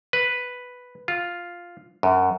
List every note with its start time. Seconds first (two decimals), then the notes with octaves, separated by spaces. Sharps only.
0.13 B4
1.08 F4
2.03 F#2